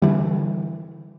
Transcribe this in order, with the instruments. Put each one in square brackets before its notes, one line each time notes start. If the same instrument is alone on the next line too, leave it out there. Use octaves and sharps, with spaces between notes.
[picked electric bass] D3 E3 G3